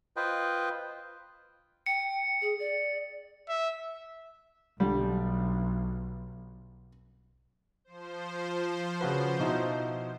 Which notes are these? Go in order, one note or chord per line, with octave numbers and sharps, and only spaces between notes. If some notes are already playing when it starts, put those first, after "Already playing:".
F4 B4 C5 D#5 G5
G5 C#7
G#4
D5
E5
B1 D3 G3
F3 C5
C#3 F#4 B4
B2 D#4 E4